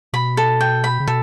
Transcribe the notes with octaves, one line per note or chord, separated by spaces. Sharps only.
B2 B5
A4
G5
B5
C#3
B2 A4